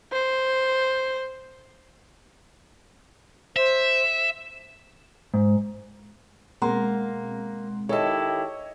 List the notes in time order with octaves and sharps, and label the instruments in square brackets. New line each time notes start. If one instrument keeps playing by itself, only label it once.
[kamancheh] C5
[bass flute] C5 [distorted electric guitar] E5
[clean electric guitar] G#2
[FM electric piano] B2 G#3 C4 [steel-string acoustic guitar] A#3 [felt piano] F#5 A#5 C6
[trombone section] D#3 E4 G4 [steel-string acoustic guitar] A4 A5 [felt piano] C#5 D#5